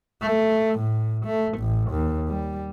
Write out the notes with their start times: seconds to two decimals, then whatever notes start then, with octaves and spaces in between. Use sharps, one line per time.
0.21 A3
0.79 A2
1.26 A3
1.59 A1
1.91 D#2
2.28 G3